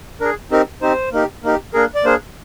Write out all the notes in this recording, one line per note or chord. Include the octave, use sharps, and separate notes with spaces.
D4 G#4 A#4
C4 D#4 G4 A#4
C4 D#4 G4 C5
A#3 D#4 G4
A#3 D#4 G4
A#3 D4 G#4 A#4
D5
A#3 D4 G#4 C5